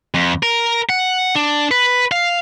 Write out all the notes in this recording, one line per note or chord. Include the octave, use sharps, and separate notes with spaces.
F2
A#4
F#5
D4
B4
F5